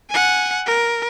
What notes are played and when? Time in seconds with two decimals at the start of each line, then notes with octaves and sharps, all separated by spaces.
0.10 F#5 G#5
0.66 A#4